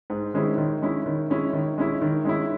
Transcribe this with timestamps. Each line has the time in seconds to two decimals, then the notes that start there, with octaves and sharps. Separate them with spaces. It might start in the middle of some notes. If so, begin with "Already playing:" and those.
0.10 G#2
0.34 D#3 G#3 C#4 E4
0.58 D#3
0.82 G#3 C#4 E4
1.06 D#3
1.30 G#3 C#4 E4
1.53 D#3
1.78 G#3 C#4 E4
2.02 D#3
2.25 G#3 C#4 E4